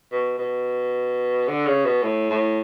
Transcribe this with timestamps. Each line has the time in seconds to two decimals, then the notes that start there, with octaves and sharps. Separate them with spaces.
0.12 B2
0.38 B2
1.48 D3
1.66 C#3
1.85 B2
2.03 A2
2.30 A2